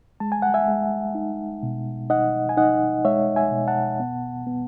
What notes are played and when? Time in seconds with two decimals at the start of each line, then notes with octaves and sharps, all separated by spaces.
0.20 G#3 A5
0.32 G#5
0.42 F#5
0.54 E5 G#5
0.68 G#3
1.15 D#4
1.63 B2
2.10 D#4 D#5 F#5
2.49 G#5
2.57 D#4 D#5 F#5
3.05 G#3 C#5 E5
3.36 E5 G#5
3.52 B2
3.68 F#5 A5
4.00 B3
4.47 B3